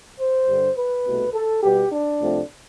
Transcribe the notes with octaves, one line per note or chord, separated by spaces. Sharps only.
C5
G2 D3 G3
B4
C2 B2 A3
A4
B2 G3 B3 G4
D4
C2 C3 F3 A3 C4